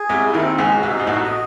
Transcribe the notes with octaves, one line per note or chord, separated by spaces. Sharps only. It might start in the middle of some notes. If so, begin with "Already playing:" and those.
Already playing: G#4
C2 C3 G#3
E4
D#2 D#3
C4
C#2 C#3 G#3
F#4
C2 C3
D#4
G#2
A1 A2 F#4
D#5